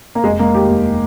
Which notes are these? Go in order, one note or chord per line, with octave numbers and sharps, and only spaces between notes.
A#3
F1 G#3
G#3 A#3
D#3 G4
D#2